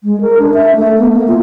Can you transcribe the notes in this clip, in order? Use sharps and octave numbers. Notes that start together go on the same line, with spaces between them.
G#3
A#4
D4
E5
A3
B3
A#3
F4